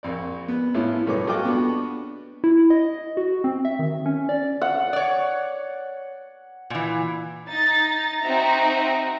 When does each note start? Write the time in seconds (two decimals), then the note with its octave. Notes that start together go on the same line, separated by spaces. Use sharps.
0.03 A#1 F2 D5
0.48 B3
0.74 A2 B3 C#4 E4 F4
1.06 B1 G2 A3 C#5 D6
1.27 F4 F#4 A4 D#5 G5 D6
1.45 B3 D4 F#4
2.44 E4
2.70 D#5
3.17 F#4
3.44 C4
3.65 E5
3.79 D#3
4.06 C#4
4.29 D5
4.61 F#5
4.93 C#5 D5
6.70 A#2 E3
7.46 D#4 A6
8.22 C4 D#4 F#4 E5 A#5